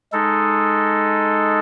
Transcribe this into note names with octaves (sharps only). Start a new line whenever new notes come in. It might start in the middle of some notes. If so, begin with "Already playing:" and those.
G#3 D#4 A4